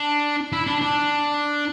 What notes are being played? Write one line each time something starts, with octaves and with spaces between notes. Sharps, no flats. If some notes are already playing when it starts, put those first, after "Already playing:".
Already playing: D4
E4
D4
D4